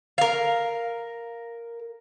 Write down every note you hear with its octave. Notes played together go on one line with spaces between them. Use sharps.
A#4 F5